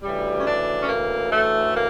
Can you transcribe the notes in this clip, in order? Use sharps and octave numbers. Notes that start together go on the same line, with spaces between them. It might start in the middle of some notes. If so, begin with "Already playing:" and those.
D2 C#3 E3 G3
C#4
D4
C#4
A#3
A3
A#3